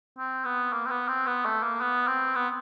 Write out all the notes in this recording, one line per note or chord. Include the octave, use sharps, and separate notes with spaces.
C4
B3
A#3
C4
B3
C4
B3
A3
A#3
B3
C4
B3